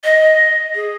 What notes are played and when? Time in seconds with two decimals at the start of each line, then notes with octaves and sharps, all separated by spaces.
0.04 D#5
0.75 G#4